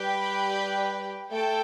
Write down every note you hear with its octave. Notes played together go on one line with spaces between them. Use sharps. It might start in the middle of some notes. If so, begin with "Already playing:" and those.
Already playing: G3 G4 B4 G5
A3 A4 G5